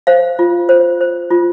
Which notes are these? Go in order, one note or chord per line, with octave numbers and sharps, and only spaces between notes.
C5 F5
F4
C5
C5
F4